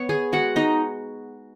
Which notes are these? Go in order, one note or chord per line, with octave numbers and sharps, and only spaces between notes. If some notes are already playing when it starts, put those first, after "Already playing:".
Already playing: B3 C#5 C#6
G#4 G#5
G#3 F#4 F#5
D#4 D#5